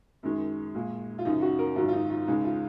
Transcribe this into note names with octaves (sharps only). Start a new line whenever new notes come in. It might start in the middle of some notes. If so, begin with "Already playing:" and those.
F#2 D#3 G#3
A#2 G#3
F4
F#2 C#3 F3 D#4
F#4
A#4
G#2 D#3 F#3 F4
F4
D#4
F4
C#2 C#3 G#3 D#4
F4